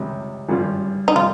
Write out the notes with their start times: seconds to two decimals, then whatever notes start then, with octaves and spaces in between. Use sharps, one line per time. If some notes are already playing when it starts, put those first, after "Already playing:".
Already playing: C#2 C3 G3
0.49 G#1 G2 G3 C#4 F4
1.08 D#4
1.15 C3 G3 F4